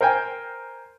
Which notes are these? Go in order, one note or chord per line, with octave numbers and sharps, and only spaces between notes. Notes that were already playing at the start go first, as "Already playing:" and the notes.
A#4 C5 G5 G#5